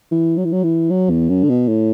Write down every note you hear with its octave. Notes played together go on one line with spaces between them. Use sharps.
E3
F#3
E3
F#3
E3
F#3
E2
F#2
D3
B2
A2